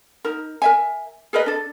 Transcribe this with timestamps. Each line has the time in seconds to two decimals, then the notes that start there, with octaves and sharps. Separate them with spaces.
0.25 D#4 A#4
0.62 A#4 E5 G#5
1.33 G#4 A#4 B4 D#5
1.46 D4 A4